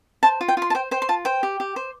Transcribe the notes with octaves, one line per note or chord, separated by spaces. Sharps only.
C5 A5
F4
G5
F4 C6
A5
C5 G5
C5 G5
C6
F4 A5
C5 G5
G4
G4
C5